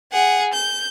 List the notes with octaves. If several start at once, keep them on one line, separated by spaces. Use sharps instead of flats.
G#4 F#5
G6